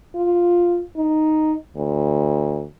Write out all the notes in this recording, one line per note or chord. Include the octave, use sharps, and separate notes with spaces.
F4
D#4
D2